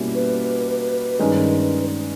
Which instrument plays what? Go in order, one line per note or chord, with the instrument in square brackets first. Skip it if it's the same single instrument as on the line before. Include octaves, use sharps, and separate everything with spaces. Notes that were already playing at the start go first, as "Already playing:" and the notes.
Already playing: [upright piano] B2 G3 A#3 C#4 E4
[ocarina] B4
[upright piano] G2 D#3 G#3 C#4